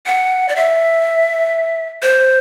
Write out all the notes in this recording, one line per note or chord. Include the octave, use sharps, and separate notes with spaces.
F#5
D5
E5
C5